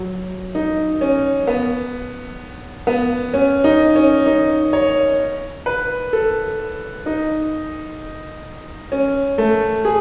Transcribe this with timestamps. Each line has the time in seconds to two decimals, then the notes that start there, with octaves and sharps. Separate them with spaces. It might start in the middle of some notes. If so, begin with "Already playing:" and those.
Already playing: F#3
0.55 D#4
1.01 C#4
1.47 B3
2.87 B3
3.34 C#4
3.64 D#4
3.96 C#4
4.26 D#4
4.73 C#5
5.66 B4
6.13 A4
7.06 D#4
8.92 C#4
9.38 A3
9.85 G#4